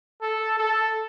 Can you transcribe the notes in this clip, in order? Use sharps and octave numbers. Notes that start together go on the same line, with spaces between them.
A4
A4